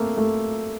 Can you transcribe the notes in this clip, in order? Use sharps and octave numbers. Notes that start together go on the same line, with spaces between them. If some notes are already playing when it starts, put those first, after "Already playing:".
Already playing: A3 A#3 C4
A3